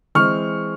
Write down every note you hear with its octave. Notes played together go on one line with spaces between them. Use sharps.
E3 G#3 C4 C#6 F6